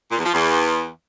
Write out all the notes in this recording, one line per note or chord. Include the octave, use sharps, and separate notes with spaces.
A#2
E2
F3
E2